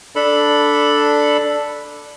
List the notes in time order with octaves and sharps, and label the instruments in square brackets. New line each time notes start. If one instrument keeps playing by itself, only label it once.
[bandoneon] D4 A4 B5